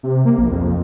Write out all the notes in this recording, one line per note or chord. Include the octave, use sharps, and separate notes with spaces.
C3
A#3
A#1
F2